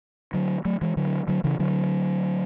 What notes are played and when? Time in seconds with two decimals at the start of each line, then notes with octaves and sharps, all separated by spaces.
0.34 D3 F#3
0.65 F#3 A3
0.81 E3 G#3
0.97 D3 F#3
1.28 D3 F#3
1.44 C#3 E3
1.59 D3 F#3